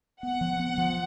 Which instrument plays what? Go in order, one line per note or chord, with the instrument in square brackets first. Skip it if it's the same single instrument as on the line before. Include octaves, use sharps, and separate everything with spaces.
[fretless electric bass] B3 [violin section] F#5
[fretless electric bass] F3
B3
F3